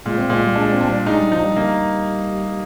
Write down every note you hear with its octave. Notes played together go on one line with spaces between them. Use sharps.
A#2 G#3
C4
A#2 G#3
G3
G#3 D4
C4
D4
G3
G#3 D#4
G3
F3 D#4
G3
A#3